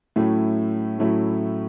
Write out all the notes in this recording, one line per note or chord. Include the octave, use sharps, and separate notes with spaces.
A2 F#3 A3 C#4 E4
A2 F#3 A3 C#4 E4